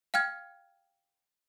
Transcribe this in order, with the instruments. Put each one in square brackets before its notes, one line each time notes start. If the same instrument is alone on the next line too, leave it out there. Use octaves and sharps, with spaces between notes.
[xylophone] F5 G5 F6 G#6